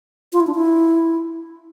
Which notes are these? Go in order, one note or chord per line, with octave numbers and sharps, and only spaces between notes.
F4
E4
D4
E4